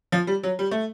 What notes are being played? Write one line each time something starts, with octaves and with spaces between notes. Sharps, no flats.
F3
G3
F#3
G3
A3